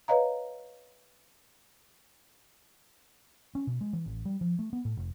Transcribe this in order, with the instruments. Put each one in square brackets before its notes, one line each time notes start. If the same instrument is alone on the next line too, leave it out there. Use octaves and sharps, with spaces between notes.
[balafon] B4 C#5 D#5 F5 A#5
[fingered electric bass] C#4
B2
G#3
E3
A1
G3
F3
A3
B3
A2
F1